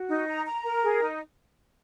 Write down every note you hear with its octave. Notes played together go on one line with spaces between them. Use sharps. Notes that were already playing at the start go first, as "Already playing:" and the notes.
Already playing: F#4
D#4
A#5
A#5
A#4
G#4
D#4